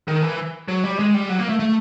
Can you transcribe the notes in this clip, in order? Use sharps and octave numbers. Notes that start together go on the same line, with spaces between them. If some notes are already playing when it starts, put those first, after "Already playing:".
D#3
E3
F#3
G3
G#3
G3
F#3
A#3
A3
A3